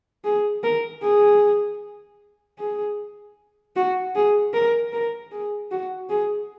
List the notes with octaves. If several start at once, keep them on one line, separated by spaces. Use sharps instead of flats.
G#4
A#4
G#4
G#4
F#4
G#4
A#4
A#4
G#4
F#4
G#4